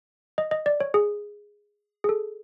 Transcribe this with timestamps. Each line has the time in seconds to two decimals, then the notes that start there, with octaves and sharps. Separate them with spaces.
0.38 D#5
0.51 D#5
0.66 D5
0.80 C#5
0.94 G#4
2.04 G#4
2.09 A4